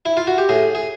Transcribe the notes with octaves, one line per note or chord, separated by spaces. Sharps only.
E4
F4
F#4
G4
A2 G#4
G#4